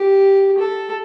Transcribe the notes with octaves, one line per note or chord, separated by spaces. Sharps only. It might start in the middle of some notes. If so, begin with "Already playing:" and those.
Already playing: G4
A4